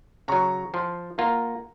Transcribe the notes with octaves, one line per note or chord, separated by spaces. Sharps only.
C#3 F#3 A#5 C#6
F3 A5 C6
A#3 F4 F#5 A#5